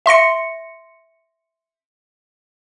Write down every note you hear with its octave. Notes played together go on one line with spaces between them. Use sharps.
E5 C6 A#6 C#7